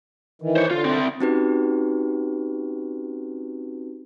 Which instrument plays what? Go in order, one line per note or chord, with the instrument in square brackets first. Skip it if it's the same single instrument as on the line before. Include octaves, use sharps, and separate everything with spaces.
[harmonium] D#3 E3
[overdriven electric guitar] C5 C#5
[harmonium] D3 [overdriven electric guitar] F4
[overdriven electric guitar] C4 E4
[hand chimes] C4 C#4 D#4 F#4 G4 B4